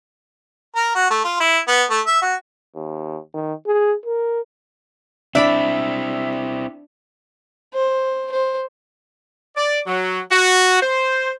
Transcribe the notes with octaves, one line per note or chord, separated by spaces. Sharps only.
A#4
F#4
A3
F4
E4
B3
A3
E5
F#4
D#2
D#3
G#4
A#4
C4 D4 E4 D5 E5 B5
C5
C5
D5
F#3
F#4
C5